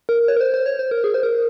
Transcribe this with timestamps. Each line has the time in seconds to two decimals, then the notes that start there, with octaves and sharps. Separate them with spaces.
0.09 A#4
0.28 C#5
0.37 A#4
0.41 C5
0.54 C5
0.66 C#5
0.79 C5
0.91 A#4
1.04 G#4
1.14 C5
1.23 A#4